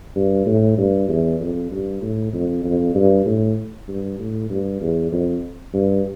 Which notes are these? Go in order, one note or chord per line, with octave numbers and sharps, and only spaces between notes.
G2
A2
G2
E2
F2
G2
A2
F2
F2
G2
A2
G2
A2
G2
E2
F2
G2